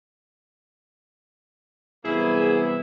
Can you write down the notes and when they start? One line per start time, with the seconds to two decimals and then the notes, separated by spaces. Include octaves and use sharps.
2.05 C2 E3 F#3 A#3 B3 E4 G#4